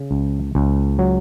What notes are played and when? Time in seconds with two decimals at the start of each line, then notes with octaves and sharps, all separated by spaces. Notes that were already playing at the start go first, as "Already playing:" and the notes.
Already playing: C#3
0.11 C#2
0.55 C#2
0.99 F#3